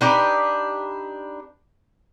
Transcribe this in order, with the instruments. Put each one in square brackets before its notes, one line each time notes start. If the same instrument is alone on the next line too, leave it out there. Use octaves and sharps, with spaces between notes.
[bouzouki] D4 D#4 G4 B4